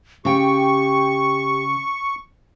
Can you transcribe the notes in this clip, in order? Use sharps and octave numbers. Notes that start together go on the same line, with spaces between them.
C#3 G4 G5 C#6